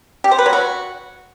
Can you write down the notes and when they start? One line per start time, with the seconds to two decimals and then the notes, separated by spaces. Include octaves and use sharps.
0.24 G4
0.31 C5
0.39 B4
0.46 F#3
0.53 F#4